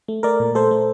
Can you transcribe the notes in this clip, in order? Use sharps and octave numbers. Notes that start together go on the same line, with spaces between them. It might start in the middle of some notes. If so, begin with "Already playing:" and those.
A3
A3 A#4 D5
A#2
A3 A4 C5
A3